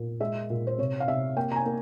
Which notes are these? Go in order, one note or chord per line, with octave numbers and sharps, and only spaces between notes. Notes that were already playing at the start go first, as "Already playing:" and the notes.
Already playing: A#2
G#3 E5
A#2
C5
C3 C#5
F5
C3 E5
A#3 G5
A#5
G#5
A#3